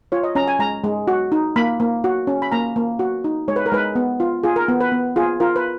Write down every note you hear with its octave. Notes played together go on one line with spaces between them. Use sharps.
F4 C#5
D#5
C#4 A#5
G#5
G#3 A#5
G#3
F#4
D#4
A#3 B5
A#3
F#4
C#4
B5
A#3 A#5
A#3
F#4
D#4
G#3 C#5
B4
A#4
G#3 B4
B3
F4
F4 G#4
A#4
B3
B4
B3
F4 G#4
F4 A#4
B4